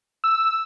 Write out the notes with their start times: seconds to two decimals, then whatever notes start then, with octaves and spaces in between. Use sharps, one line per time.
0.24 E6